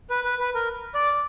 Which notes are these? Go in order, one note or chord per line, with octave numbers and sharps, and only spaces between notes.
B4
B4
B4
A#4
D5